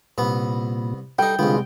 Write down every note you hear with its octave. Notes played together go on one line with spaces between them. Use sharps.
C2 A#2 B3
G3 D#4 A4 G5
C2 D3 G#3 B3 F4